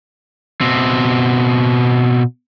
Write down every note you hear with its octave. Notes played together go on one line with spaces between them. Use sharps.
B2 C4